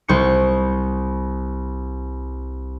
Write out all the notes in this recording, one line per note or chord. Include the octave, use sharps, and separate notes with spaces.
C2 C5 C#6 C#7